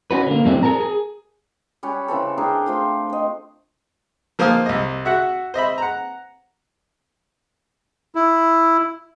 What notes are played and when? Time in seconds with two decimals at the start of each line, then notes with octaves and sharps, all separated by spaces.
0.11 C#4 F#4 B4
0.27 D3 A#3
0.45 F2 A2 G3 A3 C4 D4
0.63 G#4 A#4 A5 A#5
0.80 G#4
1.83 G3 C#4 F#5 G#5
2.08 C#3 E3 C4 A4
2.38 D4 G#4 A#4 G5
2.66 A3 F4 C5
3.09 C5 D#5
4.39 F3 A#3 C5 F5 D#6 F6
4.66 C2 D#5
5.05 F#4 E5 F#5
5.54 C5 D#5 E5 B5
5.78 F#5 A#5
8.15 E4